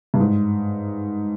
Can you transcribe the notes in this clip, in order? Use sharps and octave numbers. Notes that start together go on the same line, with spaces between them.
G2
G#2